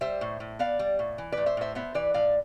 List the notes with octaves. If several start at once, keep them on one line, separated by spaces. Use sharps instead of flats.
G3 C5 E5
A2
A2
B3 D5 F5
G3
A2
E3
A2 B4 D5
C5 E5
A2 C5 E5
B3 C5 E5
E3 B4 D5
A2 D5 F5